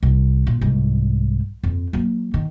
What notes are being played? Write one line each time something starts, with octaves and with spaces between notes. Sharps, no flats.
C2
A#2
C2 G#2
F2
F#3 A#3
D#3